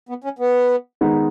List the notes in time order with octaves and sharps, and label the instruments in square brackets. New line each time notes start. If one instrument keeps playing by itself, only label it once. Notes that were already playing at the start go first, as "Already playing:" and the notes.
[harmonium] B3
C#4
B3
[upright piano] D#3 G#3 B3 D#4